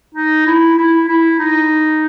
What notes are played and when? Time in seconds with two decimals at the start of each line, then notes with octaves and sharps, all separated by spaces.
0.15 D#4
0.47 E4
0.78 E4
1.08 E4
1.39 D#4